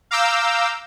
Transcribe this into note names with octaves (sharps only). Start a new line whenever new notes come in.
F5 A#5 D6 E6 G6